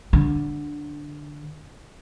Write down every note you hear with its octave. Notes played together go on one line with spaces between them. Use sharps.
D3